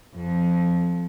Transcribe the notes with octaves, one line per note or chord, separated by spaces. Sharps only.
F2